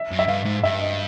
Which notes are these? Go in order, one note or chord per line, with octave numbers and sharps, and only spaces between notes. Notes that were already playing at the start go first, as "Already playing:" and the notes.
Already playing: E5
F#2
E5
G2 F5
G#2
G2 E5
D#5